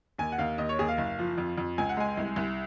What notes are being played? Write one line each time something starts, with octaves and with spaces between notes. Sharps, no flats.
D#2 G#5
F#5
D#2 F5
D#2 D#5
C#5
D#2 G#4
F5
F#1
F3
F2
F2
C#2 G#5
F#5
G#3 G#5
C2
C2